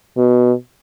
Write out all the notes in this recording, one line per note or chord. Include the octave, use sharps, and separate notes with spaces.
B2